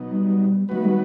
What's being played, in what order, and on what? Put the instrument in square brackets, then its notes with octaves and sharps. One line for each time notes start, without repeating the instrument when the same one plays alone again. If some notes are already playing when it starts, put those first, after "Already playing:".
Already playing: [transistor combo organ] B2 F#3 B3 D#4
[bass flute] G3
[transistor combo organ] D#3 F#3 B3 F#4 B4 [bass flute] A3
[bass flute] G3